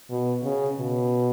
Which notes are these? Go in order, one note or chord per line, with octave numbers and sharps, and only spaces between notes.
B2
C#3
B2